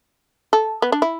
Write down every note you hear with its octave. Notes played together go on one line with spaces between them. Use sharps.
A4
B3
D4
E4